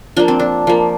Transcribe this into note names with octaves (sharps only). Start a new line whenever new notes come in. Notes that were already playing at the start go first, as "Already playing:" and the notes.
F3 A#3 D4
C4
D4
F3 A#3